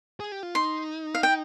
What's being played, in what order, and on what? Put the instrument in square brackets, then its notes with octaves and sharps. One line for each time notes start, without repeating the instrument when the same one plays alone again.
[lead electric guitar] G#4
G4
F4
[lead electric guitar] D#4 [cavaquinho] C6
[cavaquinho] F5
G5